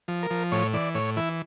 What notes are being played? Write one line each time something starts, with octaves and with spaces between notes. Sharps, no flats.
F3
A#4
F3
A2 C#5
E3 D5
A2 C#5
E3 E4